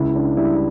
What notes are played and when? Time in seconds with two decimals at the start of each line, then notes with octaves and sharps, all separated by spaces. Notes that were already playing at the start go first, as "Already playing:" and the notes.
Already playing: C#2 E4
0.16 D4
0.37 G3 E4
0.55 E4